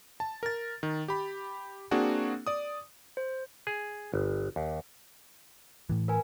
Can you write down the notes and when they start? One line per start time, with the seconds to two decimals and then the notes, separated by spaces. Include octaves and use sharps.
0.20 A5
0.43 A#4 A6
0.83 D#3
1.08 G4 B5
1.91 A#3 C4 D4 F#4 G#4
2.47 D5 D#6
3.17 C5
3.67 G#4
4.14 G1
4.56 D#2
5.89 A2 E3
6.08 A#4 B4 G#5